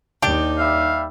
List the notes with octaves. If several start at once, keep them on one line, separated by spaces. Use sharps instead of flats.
D#2 D4 D#4 G4
G3 E5 F5